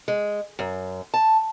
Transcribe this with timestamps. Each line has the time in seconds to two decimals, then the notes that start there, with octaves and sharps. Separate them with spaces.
0.08 G#3
0.59 F#2
1.14 A5